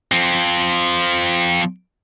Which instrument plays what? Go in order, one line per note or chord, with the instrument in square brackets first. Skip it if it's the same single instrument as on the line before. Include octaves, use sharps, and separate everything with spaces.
[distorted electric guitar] F3 C4